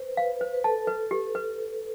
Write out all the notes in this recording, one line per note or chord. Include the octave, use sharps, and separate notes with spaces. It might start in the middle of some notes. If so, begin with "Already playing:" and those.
Already playing: B4 C5
B4 F5
C5
B4
A4 A5
B4
G4
B4